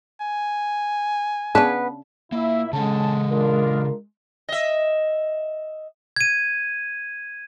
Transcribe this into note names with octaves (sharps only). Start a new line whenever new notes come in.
G#5
C#3 B3 D4 B4 A5
A#2 A#3 E4 E5
C#3 G#3 C#4 A4 A5
D4 F4 A#4
D#5 E5
G#6 D#7